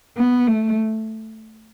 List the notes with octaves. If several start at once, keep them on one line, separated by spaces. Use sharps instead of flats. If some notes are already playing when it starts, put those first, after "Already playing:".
B3
A3